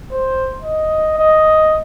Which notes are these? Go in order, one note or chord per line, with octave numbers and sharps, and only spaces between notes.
C5
D#5
D#5